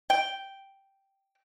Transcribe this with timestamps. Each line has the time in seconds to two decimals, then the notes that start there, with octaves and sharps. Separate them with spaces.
0.10 G5